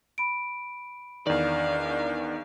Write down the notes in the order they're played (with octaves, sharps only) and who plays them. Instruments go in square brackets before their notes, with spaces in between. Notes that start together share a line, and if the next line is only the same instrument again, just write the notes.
[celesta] B5 D7
[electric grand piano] E2 D#3 [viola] D4 F5 [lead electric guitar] D5